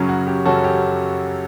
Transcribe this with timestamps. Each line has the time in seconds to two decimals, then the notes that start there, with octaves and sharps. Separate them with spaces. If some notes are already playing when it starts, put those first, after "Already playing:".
Already playing: F#2 C#3 F#3 C#4
0.09 F#4
0.27 G4
0.45 F#2 C#3 F#3 C#4 F#4 A4
0.64 G4